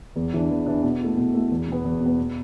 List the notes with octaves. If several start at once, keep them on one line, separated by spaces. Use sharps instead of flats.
E2
E3 D4
E2
E3 D4
B2
A3 E4
B2
A3 E4
E2
B2 B3
E2
B2
B3
B2